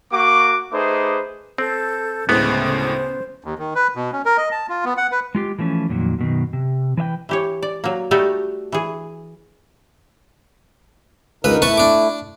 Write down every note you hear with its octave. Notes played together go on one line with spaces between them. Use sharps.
A#3 F#4 C#6 D6
A3 D#4 G#4 B4 C5 D6
C4 A4 G6
D2 A2 C#3 G#3 B3 C5
D#2
D#3
B4
B2
C#4
A#4
D#5
A5
F4
B3
F#5
B4
G#3 F4 G4
E3 F3 A3 C#4
F2 A#2 D#3 F#3
F#2 B2 D#3
C3
E3 B4 E5 G5
E3 G4 C#5
D5
F#3 A#3
G3 A3 D#4 F#4 G4 A4
E3 G#4
C#2 D3 D#4 A#4 B4
A3 E4 B4 A5 C#6
D4 D6